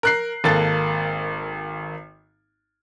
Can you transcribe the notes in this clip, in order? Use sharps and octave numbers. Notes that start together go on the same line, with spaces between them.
A#4 F#6 C7
G#1 A#3 A4 A6